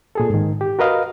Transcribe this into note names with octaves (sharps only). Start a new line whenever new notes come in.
A#2 G#4 A4
G#2 D#3
G4
F#4 A#4 B4 D#5 F5